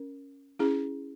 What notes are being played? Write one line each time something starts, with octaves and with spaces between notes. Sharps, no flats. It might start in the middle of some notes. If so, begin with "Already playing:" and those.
Already playing: C#4 A#4
C#4 E4 G#4